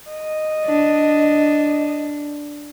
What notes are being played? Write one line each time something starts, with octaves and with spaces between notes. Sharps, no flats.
D#5
D4